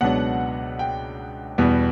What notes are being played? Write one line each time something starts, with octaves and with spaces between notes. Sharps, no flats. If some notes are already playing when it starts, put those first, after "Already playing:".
C#2 B2 F#3 B3 D4 F#5
G5
E2 B2 G3 B3